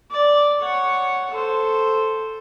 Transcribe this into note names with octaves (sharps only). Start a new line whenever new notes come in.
D5
C#5 F#5
A4 C5